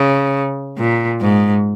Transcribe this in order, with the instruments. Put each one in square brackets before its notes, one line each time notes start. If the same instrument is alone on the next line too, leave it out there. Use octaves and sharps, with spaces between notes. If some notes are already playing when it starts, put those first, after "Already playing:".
Already playing: [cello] C#3
A#2
G#2